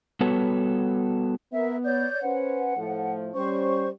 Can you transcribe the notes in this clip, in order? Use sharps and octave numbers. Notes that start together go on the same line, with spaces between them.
G3 B3 F#4 A4 B4 C#5
B3 A#4 E5
C#5 D5 G6
C#4 B4 C5 F#5
A2 F3 A3
G3 C#4 C5 C#6